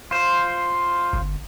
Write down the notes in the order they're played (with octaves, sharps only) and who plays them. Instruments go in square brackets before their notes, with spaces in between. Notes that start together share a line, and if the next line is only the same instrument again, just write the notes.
[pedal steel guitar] F4 C5
[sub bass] G1